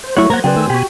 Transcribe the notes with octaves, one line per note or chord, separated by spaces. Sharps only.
C5
F#3 A3 E4 C#5 F#5 C#6
F#3 A#3 A#4 C5 F#5 A#5 G#6 A#6
C#3 F#3 G#4 B4 C5 D5 G5
D#3 A3 E6
B2 F#4 G4 G#5 B5